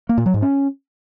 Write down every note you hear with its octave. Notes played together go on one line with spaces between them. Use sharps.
A#3
A#2
F#3
G#2
C#4